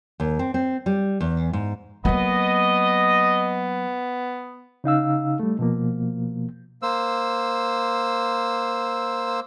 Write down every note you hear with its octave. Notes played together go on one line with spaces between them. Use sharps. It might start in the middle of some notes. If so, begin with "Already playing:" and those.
D#2
C4
C4
G3
E2
G#2
F#3 A#3 B3 D#5
C#3 D#4 F5 E6
G3 A3
B2 F3 A#3
A#3 C5 E6